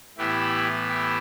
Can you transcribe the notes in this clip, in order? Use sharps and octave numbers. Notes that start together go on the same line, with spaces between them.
A2 E3 B3 E4 G4
E4 G4